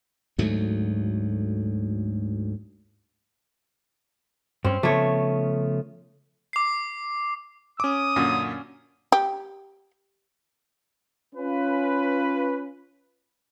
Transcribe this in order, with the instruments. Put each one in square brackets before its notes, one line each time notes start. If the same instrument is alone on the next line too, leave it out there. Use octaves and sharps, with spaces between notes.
[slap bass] D2 G#2 F#3 A3
[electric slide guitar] G2 C#4 [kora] C4
[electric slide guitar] C#3 F3 B3 [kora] A3 C#5
[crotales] D6 C7
[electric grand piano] C#4 D6 [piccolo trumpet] D#6
[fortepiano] F#2 A#2 D3
[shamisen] G4
[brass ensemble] C#4 F4 B4